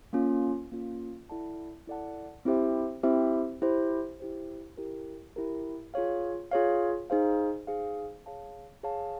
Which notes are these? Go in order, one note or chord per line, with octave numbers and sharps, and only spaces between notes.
A#3 C#4 F4
A#3 C#4 F4
E4 A4 D5 F#5 A5
E4 A4 D5 F#5 A5
C4 E4 G4 C5 E5
C4 E4 G4 C5 E5
E4 G4 C5
E4 G4 C5
E4 G4 A#4
E4 G4 A#4
F4 G#4 C#5 F5
F4 G#4 C#5 F5
D#4 G#4 C5 F5
D#4 G#4 C5 F5
G#4 C#5 F5 A5
G#4 C#5 F5 A5